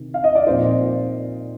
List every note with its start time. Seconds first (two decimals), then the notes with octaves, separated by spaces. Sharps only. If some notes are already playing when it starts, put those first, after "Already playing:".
Already playing: C3 D#3
0.14 F5
0.24 D#5
0.35 D5
0.46 A#2 F3 C4 D#4 C5